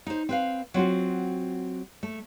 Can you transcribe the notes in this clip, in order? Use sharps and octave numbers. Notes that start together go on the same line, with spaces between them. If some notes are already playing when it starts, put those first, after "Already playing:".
D#4 C5
C4 B4 F5
F#3 C4 F4 F#4
A3